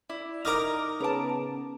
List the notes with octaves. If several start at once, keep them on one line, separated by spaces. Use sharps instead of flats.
E4 D5
D#4 A#4 A#5 D6 F6
C#3 B3 A5 A#5 D6